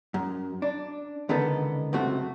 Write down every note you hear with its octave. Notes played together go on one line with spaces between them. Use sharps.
F#2
D4
C#2 D3 D#3 B3 A4
C#2 F#2 C3 A3 F#4